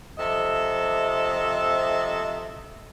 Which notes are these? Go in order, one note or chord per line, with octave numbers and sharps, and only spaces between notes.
C3 F3 A4 D#5 E5